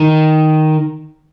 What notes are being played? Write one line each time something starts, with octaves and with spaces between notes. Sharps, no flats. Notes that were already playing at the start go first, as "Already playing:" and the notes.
Already playing: D#3